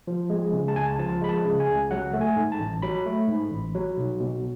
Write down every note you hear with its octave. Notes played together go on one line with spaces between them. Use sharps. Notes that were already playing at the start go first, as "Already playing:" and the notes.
F3
G#3
C#3
A5
C#2 G#5
A5
F3 A5
G#3 B5
A5
C#3
G#5
C#2
F#3 F#5
A3
G#5
G#2
A5
A1
F#3 B5
A3
G#2
A1
F#3
B1
B2